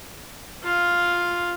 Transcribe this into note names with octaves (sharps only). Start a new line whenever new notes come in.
F4 F5